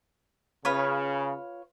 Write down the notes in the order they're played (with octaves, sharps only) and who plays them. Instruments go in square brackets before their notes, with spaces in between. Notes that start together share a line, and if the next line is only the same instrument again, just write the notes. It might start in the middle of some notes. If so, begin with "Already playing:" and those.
[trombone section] C#3 [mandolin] F4 B4 C#5